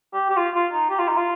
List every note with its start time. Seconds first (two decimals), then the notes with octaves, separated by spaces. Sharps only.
0.14 G4
0.30 G4
0.37 F4
0.55 F4
0.73 D#4
0.90 G4
0.99 F4
1.08 D#4
1.17 F4